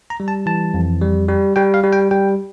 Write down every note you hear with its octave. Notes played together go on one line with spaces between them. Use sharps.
A#5
G3
A5
E3 A5
F2
G3
G3
G3 G5
F5
G3
G5
G3 G5